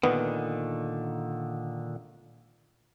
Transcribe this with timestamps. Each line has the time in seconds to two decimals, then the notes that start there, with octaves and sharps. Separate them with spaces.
0.03 A#2 D3 D#3 B3